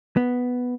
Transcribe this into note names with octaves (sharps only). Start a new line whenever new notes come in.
B3